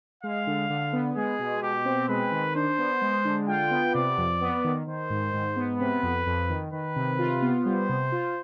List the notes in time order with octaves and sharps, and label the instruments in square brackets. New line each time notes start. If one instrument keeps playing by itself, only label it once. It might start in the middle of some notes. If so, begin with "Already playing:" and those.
[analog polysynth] G#3 [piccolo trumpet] F5
[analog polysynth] D3
D3
B3
[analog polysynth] G#3 [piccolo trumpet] G#4
[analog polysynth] B2
[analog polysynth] B2 [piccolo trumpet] G4
[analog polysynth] C4
[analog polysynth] G#3 [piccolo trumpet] B4
[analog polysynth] D#3
[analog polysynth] D4 [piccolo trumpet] C5
[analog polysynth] B3
G#3
D3
[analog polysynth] F4 [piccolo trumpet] G5
[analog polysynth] B3
[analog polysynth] C3 [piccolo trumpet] D5
[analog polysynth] F2
B3
D#3
[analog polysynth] D#3 [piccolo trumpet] C5
[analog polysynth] G#2
G#2
B3
[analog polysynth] C3 [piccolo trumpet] B4
[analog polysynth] F2
F2
D#3
[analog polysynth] D#3 [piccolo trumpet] B4
[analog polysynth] C3
F4
B3
[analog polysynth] G3 [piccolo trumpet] C5
[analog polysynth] C3
F4